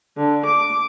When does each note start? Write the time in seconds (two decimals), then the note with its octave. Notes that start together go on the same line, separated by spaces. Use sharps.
0.16 D3
0.46 D6